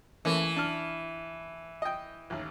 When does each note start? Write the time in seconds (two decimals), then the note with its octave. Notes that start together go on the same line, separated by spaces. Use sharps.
0.25 E3 A3 A#3 C#4
0.56 D4 F6
1.82 D#5 G5
2.30 A1 D#2